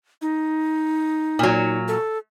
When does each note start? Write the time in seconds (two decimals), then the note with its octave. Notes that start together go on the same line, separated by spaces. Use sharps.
0.22 D#4
1.39 A#2 F#3
1.88 A4